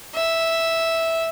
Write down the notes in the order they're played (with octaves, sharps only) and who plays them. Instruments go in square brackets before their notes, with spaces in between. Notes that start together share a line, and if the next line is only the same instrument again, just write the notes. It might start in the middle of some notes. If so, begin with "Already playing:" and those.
[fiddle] E5